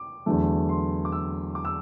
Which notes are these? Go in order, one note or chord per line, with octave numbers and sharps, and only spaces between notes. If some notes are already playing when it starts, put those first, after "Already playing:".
Already playing: D6
E2 D3 F#3 A3
C6
D6
E6
D6
E6